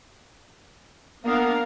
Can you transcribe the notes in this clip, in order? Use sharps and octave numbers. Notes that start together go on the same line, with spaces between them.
A#3 B3 D4 A#4 F5